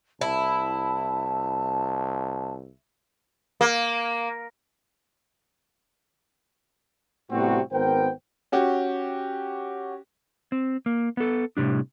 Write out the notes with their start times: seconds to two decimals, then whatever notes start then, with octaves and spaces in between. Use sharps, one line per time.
0.21 C2 E4 A5
3.61 A#3
7.31 A2 C3 G3 B3 C4 F#4
7.72 G#1 B3 A#4 C5 G5
8.52 C#4 F#4 G4
10.52 C4
10.86 A#3
11.17 B3 A4
11.57 A2 C3 G3 D4